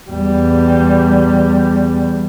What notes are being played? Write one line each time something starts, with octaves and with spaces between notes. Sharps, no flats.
E2 G3